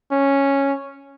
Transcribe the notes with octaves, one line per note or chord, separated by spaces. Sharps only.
C#4